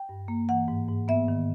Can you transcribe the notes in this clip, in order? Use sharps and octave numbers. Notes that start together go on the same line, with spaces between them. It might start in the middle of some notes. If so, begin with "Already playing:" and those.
Already playing: G5
G2
A#3
E3 F#5
G#2
G#2
B3 E5
D#3